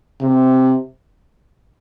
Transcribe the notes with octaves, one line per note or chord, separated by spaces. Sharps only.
C3